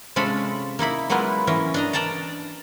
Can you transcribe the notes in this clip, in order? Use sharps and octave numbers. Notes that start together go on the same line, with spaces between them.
C3 G#3 C#4 F4 A4 B5
A#3 D#4 E4 B5
F#3 G#3 A#3 B3 E4 F4
E3 C#4 A#4
D4 D#5 A#5
A#4 D5 G5 A5 A#5